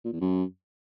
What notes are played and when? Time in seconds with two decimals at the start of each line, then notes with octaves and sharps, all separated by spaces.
0.05 A#2
0.12 E2
0.20 F#2